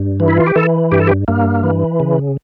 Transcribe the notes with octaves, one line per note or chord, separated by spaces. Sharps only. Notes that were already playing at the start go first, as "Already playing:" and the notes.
Already playing: G2
E3
E4
F4
G4
E3 A4
G2 G4
A4
G4
G2 A#3
E3
C#3